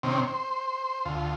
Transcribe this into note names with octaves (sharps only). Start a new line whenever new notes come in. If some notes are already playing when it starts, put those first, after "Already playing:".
C3 D#3 C4 C#4
C5
D2 F4